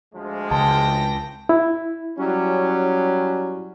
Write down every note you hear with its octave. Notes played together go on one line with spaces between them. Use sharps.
D2 F3 G#3
C#2 G5 A5 A#6
E4
F#3 G3 C#4